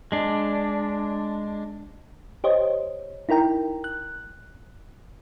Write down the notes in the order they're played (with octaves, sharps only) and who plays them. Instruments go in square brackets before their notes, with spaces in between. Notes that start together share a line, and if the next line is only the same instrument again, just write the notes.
[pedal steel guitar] G#3 D4
[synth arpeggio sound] G4 C5 C#5 D#5
D#4 E4 A#4 G5 A#5
F#6